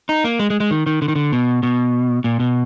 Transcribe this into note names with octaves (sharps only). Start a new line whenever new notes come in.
D#4
A#3
G#3
G#3
G#3
D#3
D#3
D3
D#3
D3
B2
B2
A#2
B2